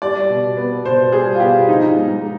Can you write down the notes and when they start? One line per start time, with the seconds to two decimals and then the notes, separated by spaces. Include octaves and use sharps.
0.02 G3 D5
0.30 B2
0.57 B3
0.84 B2 C5
1.12 G3 G#4
1.35 F4
1.40 B2 G4
1.68 F3 D#4
1.96 G#2
2.23 G#3